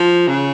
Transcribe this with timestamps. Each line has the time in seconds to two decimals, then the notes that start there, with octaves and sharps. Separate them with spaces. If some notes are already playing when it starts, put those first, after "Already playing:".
Already playing: F3
0.28 C#3